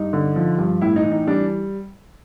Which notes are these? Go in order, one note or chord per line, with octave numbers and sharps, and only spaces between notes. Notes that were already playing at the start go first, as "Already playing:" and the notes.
Already playing: G2 D#4
D3
F3
G2
A2 E4
D#4
E3
D#4
G3 D4